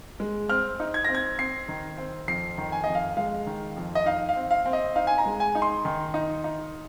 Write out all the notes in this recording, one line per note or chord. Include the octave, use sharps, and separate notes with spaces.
G#3
C4 F6
D#4
G#6
C4 A#6
G#6
C4 C7
D#3
C4
F2 C7
D#3
G#5
F2 D#5
F5
G#3 F5
D#3
F2
D#5
D#4 F5
F5
C4
F5
C4
D#5
D#4 F5
G#5
A#5
G#3
G#5
D#4
C6
D#3
D#4
D#4